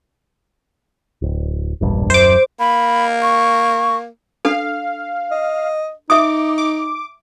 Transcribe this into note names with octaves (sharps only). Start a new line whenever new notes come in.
D1
E1 A#1 G2
D#1 F#2 C5 D6
A#3 B5
C#6
D4 A4 F5
D#5
D#4 E5 D6 D#6
D6